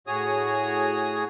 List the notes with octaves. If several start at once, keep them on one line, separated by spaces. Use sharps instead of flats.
A2 F#4 G#4 C#5 D#6